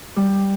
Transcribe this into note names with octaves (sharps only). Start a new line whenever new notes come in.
G3